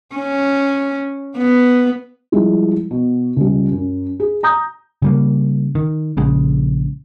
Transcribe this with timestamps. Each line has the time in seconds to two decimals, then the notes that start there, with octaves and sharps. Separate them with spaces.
0.15 C#4
1.38 B3
2.32 F3 G3 G#3 E4
2.91 B2
3.36 C#2 G3
3.72 F#2
4.20 G#4
4.43 A#5 D#6 G6
5.02 C#3 G3 A#3
5.75 D#3
6.17 A#1 C#3 G#3